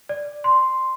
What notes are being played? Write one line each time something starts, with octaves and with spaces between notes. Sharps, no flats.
D5
C6